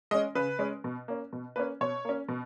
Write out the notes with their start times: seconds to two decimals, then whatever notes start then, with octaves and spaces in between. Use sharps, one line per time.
0.11 G#3 C#4 D#5
0.35 C#3 B4
0.59 G#3 C#4
0.84 B2
1.08 A#3 C#4
1.33 B2
1.56 A#3 C#4 B4
1.81 B2 C#5
2.05 A#3 C#4
2.28 B2